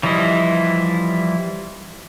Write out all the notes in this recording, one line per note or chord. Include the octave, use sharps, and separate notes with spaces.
E3 F3 G3 E4 D#5